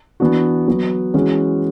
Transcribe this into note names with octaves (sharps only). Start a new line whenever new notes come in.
E3 B3 D4 F#4
F#3 B3 F#4
E3 G#3 C#4 F#4